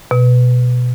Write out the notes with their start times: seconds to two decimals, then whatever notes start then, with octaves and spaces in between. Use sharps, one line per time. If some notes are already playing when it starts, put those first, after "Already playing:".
0.11 B2